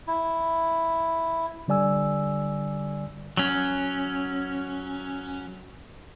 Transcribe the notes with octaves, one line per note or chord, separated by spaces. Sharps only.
E4
D3 G3 D5 G#5 E6
F#3 C#4